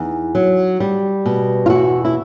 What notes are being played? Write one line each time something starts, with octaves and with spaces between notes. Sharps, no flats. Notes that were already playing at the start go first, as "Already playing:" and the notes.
Already playing: E2 D#4
F#3
G3
B2
F4
E2 E4 F#4
E4